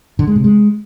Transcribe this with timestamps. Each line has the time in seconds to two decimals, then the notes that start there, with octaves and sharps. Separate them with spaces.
0.19 D3
0.27 G#3
0.36 C3
0.44 G#3